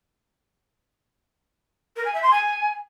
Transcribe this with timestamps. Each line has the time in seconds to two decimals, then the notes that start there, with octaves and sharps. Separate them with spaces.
1.96 A#4
2.05 G#5
2.14 E5
2.22 C6
2.31 G#5